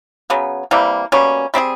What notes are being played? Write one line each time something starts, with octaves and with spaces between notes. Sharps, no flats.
C#3 F#3 B3
C3 E3 G3 A#3
B2 G3 A#3 C#4
G3 C4 D#4 G#4